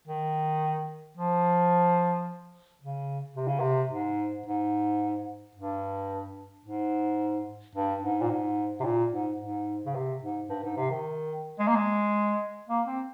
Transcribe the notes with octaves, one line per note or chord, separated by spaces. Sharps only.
D#3
F3
C#3
C3
C#3
C3
G#2
G#2
G2
G#2
G2
G#2
A#2
G#2
C3
A#2
G#2
G#2
C#3
C3
G#2
G2
G#2
C3
D#3
G#3
A#3
G#3
A#3
C4